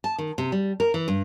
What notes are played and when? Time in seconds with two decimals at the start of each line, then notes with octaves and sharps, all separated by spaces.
0.04 A5
0.18 D#3
0.38 C3
0.52 G3
0.80 A#4
0.94 E3
1.08 G2